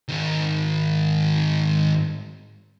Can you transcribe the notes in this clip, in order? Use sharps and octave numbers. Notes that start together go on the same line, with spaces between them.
G#2 D#3